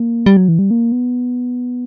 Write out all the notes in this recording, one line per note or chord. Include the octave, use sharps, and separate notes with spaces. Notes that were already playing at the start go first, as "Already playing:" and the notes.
Already playing: A#3
G3
F#3
E3
G3
A#3
B3